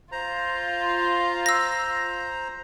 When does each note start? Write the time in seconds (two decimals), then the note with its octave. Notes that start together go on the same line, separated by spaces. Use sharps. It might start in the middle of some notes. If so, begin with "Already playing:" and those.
0.12 F4 C5 A#5
1.46 E6 A#6